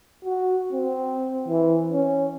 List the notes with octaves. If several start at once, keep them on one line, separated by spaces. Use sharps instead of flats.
F#4
C4
E3
C#4